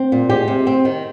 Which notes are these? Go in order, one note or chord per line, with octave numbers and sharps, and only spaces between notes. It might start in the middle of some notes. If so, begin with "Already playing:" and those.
Already playing: C4
A#2
G#3 G4
C3
C4
D#3